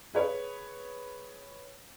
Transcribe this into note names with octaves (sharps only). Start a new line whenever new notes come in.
G#4 B4 C#5